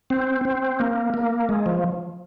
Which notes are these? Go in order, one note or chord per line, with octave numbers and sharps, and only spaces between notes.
C4
C4
A#3
A#3
G#3
F3